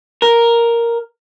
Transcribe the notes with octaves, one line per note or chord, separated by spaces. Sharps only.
A#4